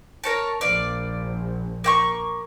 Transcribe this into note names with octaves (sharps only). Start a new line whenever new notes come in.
A#4 C#5 A5
A#1 D5 F5
A#3 G5 C#6